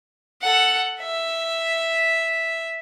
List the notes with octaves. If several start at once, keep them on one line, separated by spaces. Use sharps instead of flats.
A4 F#5
E5